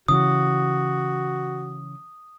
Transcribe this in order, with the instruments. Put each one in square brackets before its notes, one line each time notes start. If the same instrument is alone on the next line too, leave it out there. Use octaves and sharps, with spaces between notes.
[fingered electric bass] C#3 E3 [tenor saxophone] F#4 [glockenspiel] D#6